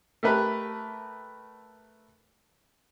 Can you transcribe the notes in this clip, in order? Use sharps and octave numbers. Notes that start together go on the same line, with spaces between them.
A3 G4 A#4 B4